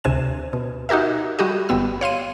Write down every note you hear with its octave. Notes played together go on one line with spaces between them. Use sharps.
D2 C3 G#5 E7
B2
D#4 F#4 G4 A#4 E5
G3 F#4 G4 D#5
G1 G3 B3 E6
C#5 F5 C6 D#7